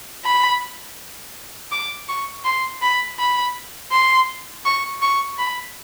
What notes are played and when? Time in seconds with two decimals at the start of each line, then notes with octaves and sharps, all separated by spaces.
0.25 B5
1.72 D6
2.09 C#6
2.45 C6
2.82 B5
3.19 B5
3.92 C6
4.65 C#6
5.02 C#6
5.38 B5